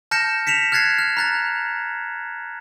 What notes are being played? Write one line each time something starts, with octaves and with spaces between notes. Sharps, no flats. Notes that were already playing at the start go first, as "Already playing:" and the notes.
A5 F6 G6 A#6 C#7 E7
B6 C#7 E7 F7
F6 F#6 G#6 A6 C7
F6
A#5 F#6 A6